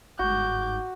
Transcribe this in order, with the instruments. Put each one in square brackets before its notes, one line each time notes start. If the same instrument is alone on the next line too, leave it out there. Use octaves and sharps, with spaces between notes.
[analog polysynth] G1 G#2 [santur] F#4 [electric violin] D6 G6